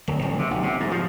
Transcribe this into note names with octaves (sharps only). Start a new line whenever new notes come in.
D1
F1
C3
B1
C3
G#2
F3